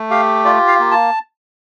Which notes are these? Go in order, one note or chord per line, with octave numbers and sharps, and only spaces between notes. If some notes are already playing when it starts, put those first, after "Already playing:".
Already playing: A3
G4 F5
F4 D5
F5
A#3
A5